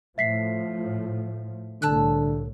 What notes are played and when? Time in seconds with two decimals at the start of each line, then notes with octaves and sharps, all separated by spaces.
0.18 A2 F3 E5 B6 C7
1.82 C2 A2 D3 A5 E6 F#6